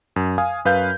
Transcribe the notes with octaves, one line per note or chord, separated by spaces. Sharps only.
F#2
F5 G#5 D#6
F#2 B4 F5 G6